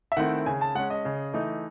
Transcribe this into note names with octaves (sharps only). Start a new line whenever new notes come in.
E5
D#3 A3 C4 E4 F#5
C#3 G#5
A5
G#3 C#4 F#5
D#5
C#3
E3 A3 D#4